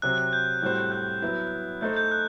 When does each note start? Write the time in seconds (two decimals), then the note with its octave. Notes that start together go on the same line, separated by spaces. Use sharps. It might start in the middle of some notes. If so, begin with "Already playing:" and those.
0.02 C3 F#3 C4 F#6
0.18 F#6
0.33 G6
0.62 A2 G3 C4 F#4 C5
0.92 F#6
1.22 F#3 B3 E4
1.81 A3 D#4 A4 C5 G6
1.97 G6
2.12 F#6